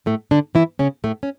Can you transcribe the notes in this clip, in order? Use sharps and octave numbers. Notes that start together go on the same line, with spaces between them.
A2 A3
D3 D4
E3 E4
C#3 C#4
A2 A3
C#4